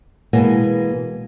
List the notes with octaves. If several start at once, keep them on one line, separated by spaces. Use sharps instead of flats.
B2 E3 G#3 A#3 B3